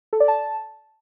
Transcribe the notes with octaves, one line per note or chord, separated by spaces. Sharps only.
A4
D5
A5